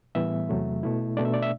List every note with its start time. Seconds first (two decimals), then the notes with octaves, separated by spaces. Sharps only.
0.15 A2 E3 G3 B3 E5
0.49 E2 C3 F#3 A3
0.83 B2 A3 E4
1.17 B2 A3 D4 D5
1.25 E5
1.34 D5
1.42 E5